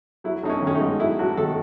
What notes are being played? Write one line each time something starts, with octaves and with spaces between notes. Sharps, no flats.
F#3 E4
A1 D#4
C#4
D#3 C#4
D#4
G#2
F#3 E4
A1 F#4
D#3 A4